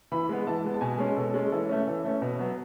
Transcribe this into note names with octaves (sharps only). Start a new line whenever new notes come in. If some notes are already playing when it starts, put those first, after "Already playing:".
E3 B5
G#3 B3
E3 A5
G#3 B3
A5
B2 G#5
G#3 C#4
B2 A4
G#3 C#4
E3 A4
A3 C#4
E3
A3 C#4
B2
F#3 B3